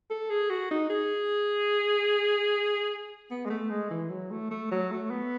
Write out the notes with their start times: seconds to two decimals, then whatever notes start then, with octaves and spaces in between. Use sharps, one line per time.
0.10 A4
0.30 G#4
0.50 F#4
0.71 D#4
0.90 G#4
3.31 B3
3.46 G#3
3.50 A3
3.70 G#3
3.90 E3
4.10 F#3
4.30 A3
4.51 A3
4.71 F#3
4.91 A3
5.10 B3